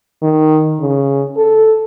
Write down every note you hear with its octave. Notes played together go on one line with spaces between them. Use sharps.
D#3
C#3
A4